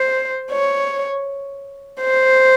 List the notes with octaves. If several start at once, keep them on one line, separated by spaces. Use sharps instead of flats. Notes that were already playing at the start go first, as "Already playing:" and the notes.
Already playing: C5
C#5
C5